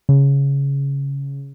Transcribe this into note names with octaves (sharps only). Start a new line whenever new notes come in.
C#3